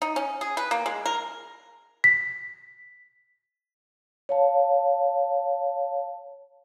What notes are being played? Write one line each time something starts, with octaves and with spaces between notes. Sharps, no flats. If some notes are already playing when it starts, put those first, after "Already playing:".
D#4
C#4
G#4
B4
A#3
G#3
A#4
B6
C#5 F5 A5